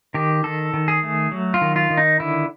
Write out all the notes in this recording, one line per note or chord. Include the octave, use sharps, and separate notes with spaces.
D#3 G4
D#3 A4
D#3
G#4
A3
F#3
F4
D#3
F4
D#3
D#4
D3 E4